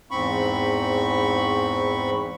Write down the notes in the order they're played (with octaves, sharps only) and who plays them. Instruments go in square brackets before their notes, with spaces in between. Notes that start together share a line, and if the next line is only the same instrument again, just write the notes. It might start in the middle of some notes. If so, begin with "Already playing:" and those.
[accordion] E2 G#2 C4 B5 C#6